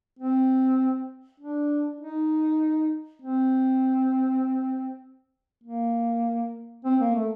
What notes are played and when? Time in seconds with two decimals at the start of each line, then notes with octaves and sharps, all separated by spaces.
0.19 C4
1.40 D4
2.00 D#4
3.22 C4
5.64 A#3
6.85 C4
7.01 A#3
7.15 A3